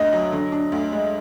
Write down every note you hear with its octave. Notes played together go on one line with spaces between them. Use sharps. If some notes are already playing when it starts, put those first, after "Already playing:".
Already playing: D2 D4 D#5
F#3
D3
D4
D2
G#3